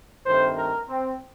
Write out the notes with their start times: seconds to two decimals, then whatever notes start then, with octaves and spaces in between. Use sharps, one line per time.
0.25 G2 D#3 A3 C4 C5
0.56 A#4
0.88 C4